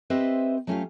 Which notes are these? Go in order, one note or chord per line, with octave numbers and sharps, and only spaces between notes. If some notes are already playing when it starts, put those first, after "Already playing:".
C4 G4 B4 C5 D#5 E5
F#3 A3 C#4 F4 G4 F5